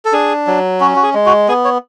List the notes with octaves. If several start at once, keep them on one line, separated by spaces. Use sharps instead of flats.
A4
D4 G#4
F#3
C#4 F#4
F#4
G#4
G#3
F#4
B3 G#4
C#5